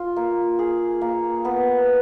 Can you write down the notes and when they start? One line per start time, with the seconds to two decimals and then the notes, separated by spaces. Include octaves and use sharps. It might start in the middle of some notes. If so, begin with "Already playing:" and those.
Already playing: F4
0.16 A#3
0.59 G#4
1.01 A#3
1.45 B3